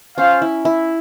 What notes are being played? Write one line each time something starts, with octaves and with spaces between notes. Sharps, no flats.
C#4 F4 C5 F5
E4
E4